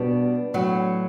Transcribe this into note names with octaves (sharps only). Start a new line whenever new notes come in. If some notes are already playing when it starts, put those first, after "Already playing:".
Already playing: B2 G3 D4
A2 F#3